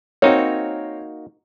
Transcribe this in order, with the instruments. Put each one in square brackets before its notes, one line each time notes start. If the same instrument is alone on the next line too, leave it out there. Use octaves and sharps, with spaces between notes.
[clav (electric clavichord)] A#3 D#4 F#4 [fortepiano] C4 A#4 C#5